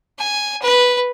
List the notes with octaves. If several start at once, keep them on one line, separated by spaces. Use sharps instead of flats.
G#5
B4